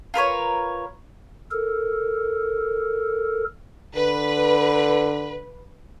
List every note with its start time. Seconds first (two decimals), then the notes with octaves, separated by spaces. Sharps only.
0.14 F4 A#4 B4 C#5
1.52 A4 A#4
3.95 D3 B4